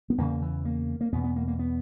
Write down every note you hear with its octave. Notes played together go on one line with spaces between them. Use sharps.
B3
E2 C#3 A#3
E3
A#3
A#3
E2 B2 B3
B3
A#3
A#3
B3